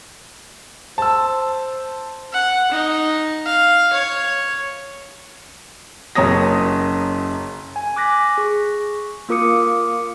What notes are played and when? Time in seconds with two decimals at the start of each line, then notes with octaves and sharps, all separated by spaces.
0.98 C5 A5 E6
2.32 F#5
2.72 D#4
3.46 F5
3.93 C#5
6.15 F#1 F#2 C#5 D#6 A#6
7.76 G#5
7.96 D6 F#6 A#6 B6
8.38 G#4 C#6
9.29 A#3 F4 A#4 D6 D#6 C#7